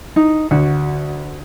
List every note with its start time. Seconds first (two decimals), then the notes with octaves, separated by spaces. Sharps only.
0.16 D#4
0.51 D2 F#4